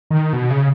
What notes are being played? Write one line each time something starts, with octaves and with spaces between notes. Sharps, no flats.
D#3
B2
C#3